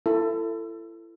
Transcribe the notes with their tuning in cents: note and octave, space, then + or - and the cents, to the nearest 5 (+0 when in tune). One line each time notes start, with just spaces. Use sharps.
E4 +30 A4 +20